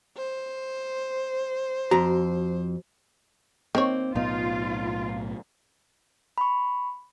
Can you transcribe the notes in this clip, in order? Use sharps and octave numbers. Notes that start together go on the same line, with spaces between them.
C5
F2 F#4 A#5
D#3 A#3 C4 C#5
B1 A2 B3 D#4 F4
B5 C#6